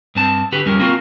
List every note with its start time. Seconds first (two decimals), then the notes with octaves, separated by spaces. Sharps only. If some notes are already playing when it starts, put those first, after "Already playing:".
0.15 G2 C4 A5
0.52 D3 F#4 G4 B4
0.66 F2 G3 C#4 A#4
0.79 A#3 C4 F4 F#4 A4 A#4